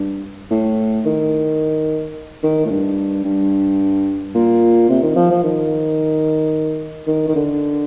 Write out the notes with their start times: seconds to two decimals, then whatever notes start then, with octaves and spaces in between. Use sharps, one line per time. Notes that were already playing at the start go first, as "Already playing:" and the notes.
Already playing: G2
0.51 A2
1.05 D#3
2.43 D#3
2.65 A2
2.70 G2
3.24 G2
4.35 A#2
4.89 C3
5.03 D#3
5.16 F3
5.31 F3
5.44 D#3
7.07 D#3
7.28 D#3
7.36 D3